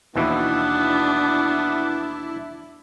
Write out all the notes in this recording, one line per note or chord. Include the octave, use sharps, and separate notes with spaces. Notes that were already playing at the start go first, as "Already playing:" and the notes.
D#2 B2 E3 B3 D4 E4